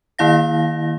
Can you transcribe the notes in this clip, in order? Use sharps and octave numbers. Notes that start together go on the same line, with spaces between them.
D#3 A#3 E4 F5 A#6